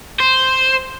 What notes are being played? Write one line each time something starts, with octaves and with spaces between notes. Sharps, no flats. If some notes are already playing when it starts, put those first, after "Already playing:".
C5